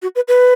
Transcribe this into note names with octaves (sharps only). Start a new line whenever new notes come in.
F#4
B4
B4